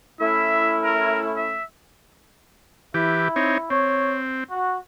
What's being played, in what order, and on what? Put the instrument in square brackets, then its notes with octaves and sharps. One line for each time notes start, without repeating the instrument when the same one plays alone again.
[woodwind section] A3 C#4 E4 [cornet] E5
[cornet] A#4
E5
[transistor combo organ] E3 G4 [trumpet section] E4
[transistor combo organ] C4 D#4 C#5
[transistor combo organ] C4 [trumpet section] C#5
[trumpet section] F#4